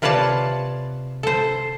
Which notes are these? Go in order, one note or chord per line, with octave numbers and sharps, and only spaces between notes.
C3 F4 B4 C#5 D5 A5
A4 C5